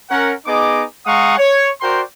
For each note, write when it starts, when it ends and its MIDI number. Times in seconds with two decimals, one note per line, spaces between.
0.10 0.32 61
0.10 0.32 70
0.10 0.32 78
0.46 0.83 59
0.46 0.83 63
0.46 0.83 68
0.46 0.83 75
0.46 0.83 86
1.06 1.36 56
1.06 1.36 77
1.06 1.36 78
1.06 1.36 82
1.06 1.36 85
1.06 1.36 87
1.37 1.70 73
1.82 2.02 66
1.82 2.02 70
1.82 2.02 72
1.82 2.02 74
1.82 2.02 79
1.82 2.02 84